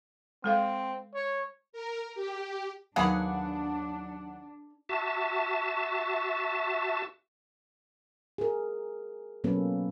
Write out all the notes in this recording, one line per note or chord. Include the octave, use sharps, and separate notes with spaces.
G#3 C4 A4 F5
C#5
A#4
G4
D#2 F#3 A#3 B3 D4 G#4 F#5
F#4 E5 A5
G#4 A#4
B2 F#3 A#3 C#4 A4 B4